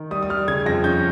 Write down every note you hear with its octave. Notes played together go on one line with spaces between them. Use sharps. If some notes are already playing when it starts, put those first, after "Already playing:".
Already playing: D#3
G3 D#6
D#6
G3 F6
C#3 G#6
F2 A#6
C#4 G6